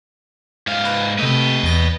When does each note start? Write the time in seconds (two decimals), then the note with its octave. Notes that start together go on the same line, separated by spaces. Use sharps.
0.67 G#2 F5
0.85 B4
1.18 C3 A3 B4 D#5
1.63 E2 A#6